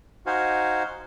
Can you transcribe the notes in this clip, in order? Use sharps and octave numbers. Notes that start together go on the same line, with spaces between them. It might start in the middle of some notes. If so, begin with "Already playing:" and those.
D#4 F#4 C5 F5 G#5